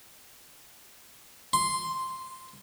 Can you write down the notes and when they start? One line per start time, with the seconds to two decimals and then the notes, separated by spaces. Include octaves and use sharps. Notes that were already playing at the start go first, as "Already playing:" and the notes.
1.53 C6